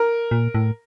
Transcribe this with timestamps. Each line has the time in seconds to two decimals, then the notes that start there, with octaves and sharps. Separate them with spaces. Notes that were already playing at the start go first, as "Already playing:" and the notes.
Already playing: A#4
0.31 A#2
0.55 A2